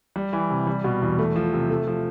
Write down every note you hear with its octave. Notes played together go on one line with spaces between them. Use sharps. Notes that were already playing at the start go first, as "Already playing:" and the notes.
G3
E3
C3
G3
B2
E2
A3
F3
C3
A3
F3